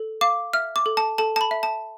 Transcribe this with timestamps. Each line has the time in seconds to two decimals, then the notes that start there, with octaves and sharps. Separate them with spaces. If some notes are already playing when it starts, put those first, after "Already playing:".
Already playing: A4
0.21 F5 D6
0.53 E5 F6
0.76 D6
0.86 A4
0.97 A5
1.18 A4 A5
1.36 A5
1.41 B5
1.51 E5
1.63 A5